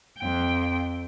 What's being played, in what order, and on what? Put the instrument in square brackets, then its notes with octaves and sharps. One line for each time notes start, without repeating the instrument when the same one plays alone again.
[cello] F2 G5